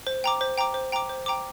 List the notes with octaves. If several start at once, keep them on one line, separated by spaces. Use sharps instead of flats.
C5
G5 A#5 D6
C5
G5 A#5 D6
C5
G5 A#5 D6
C5
G5 A#5 D6